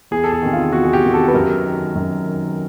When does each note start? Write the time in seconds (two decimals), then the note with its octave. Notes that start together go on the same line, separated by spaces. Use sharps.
0.11 E2 G#4
0.24 A4
0.32 G#4
0.42 C3 D#3
0.53 F4
0.73 E2 F#4
0.85 G#4
0.93 G4
1.03 C3 D#3
1.14 A4
1.28 B4
1.34 F#2 A#4
1.65 D#3
1.95 F#2
2.26 D#3